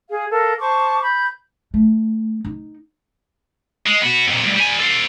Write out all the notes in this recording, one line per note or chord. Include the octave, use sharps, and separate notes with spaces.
G#4 F5
A4 A#4 F5
C5 A5 C#6 D6
B5 G6
A3
D#4
G#3
B3 F#4
F2 A#2
D2 G2
G3 G#5
A4 C5